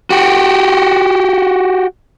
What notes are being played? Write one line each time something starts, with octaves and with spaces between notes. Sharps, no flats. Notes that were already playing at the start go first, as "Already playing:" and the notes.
F#4 G4